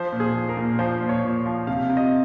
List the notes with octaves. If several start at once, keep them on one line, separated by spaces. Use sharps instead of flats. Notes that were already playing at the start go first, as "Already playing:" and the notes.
Already playing: F3 C5
A#2
G#4
F3
A#4
A#2
F3 C5
A#2
C#5
A#2
F3
C3 F5
C3
D#5